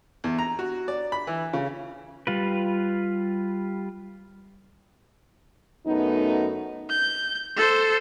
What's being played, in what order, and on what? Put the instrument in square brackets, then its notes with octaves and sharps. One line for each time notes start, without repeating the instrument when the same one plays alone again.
[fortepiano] E2
A#5
F#4
D5
B5
E3
C#3
[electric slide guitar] G3 F4 B4
[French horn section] F#2 A3 B3 D#4
[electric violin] G6
A4 C5